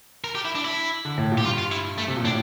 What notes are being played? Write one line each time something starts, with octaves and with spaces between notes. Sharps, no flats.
A#4
G4
E4
D4
E4
D3
A2
A#2
G4
G2 F4
F4
E4
A3
C3
A#2
A2 D4